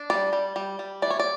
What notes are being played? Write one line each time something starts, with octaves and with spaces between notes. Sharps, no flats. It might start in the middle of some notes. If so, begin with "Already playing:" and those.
Already playing: D4
G3 D5
G3
G3
G3
E3 D5
C#5
D5